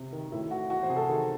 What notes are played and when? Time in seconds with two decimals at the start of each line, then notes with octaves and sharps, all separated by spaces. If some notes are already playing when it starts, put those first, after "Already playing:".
Already playing: C3
0.13 D#3
0.32 A2 E4
0.51 E3 F#4
0.69 E3 F#4
0.83 C5
0.89 C3 G#4
0.96 A4
1.09 D#3